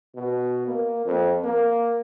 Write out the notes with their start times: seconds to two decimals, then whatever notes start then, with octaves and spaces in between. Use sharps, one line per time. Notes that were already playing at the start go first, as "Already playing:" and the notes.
0.15 B2
0.67 A#3
1.05 F2
1.44 A#3